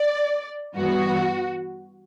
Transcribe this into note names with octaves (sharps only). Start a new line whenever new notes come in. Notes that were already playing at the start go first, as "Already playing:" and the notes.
Already playing: D5
G2 E3 B3 F#4